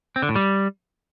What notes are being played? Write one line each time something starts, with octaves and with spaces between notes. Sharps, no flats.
C4
D3
A2
G3